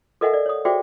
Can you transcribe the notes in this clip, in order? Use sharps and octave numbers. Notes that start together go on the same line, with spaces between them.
A4 A#4 D#5 E5 F#5 G#5
D5
C#5 D#6
F#4 G#4 C5 D5 E5 G5